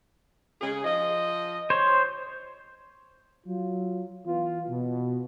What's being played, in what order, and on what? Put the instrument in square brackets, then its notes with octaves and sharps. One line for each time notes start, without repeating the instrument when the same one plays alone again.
[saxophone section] C#3 G#4
F3 D#5
[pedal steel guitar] C5 C#5
[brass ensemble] F#3 F4
E3 B3 F4
B2